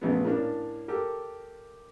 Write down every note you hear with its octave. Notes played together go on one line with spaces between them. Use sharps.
A#1 C#3 A3 B3
A2 A#3 C#4 D4
G4 A4 A#4